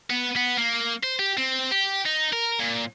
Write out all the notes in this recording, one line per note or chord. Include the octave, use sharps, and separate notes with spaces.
B3
B3
A#3
C5
G4
C4
G4
D#4
A#4
A#2